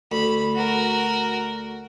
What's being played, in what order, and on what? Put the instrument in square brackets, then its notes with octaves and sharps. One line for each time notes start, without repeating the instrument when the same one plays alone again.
[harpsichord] D2 [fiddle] B5
[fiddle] F#4 A#4